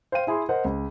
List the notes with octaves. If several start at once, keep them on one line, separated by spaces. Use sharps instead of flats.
C5 F5 G5 D#7
E4 G#4 B5 C6
A#4 C5 D#5 F#5
C#2